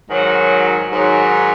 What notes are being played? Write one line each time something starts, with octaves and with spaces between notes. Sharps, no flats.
G#2 D#3 F#3
G#2 D#3 F#3